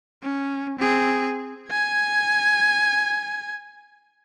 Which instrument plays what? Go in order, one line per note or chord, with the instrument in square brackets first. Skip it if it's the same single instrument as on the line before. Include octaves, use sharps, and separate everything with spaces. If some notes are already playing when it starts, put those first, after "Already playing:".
[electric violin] C#4
C4 G#4
G#5 G#6